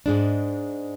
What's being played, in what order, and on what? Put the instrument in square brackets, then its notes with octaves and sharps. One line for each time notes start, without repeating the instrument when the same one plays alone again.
[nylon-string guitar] G#2 G#3 D4